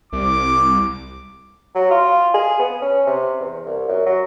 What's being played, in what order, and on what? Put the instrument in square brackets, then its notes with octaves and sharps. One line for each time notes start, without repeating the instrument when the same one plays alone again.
[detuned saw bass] C2 [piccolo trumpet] D6
[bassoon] F#3
F4
G#4
B3
C#4
C3
E2
C2
F#2
F#3